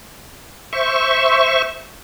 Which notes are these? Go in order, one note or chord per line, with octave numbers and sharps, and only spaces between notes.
C5 E5 C#6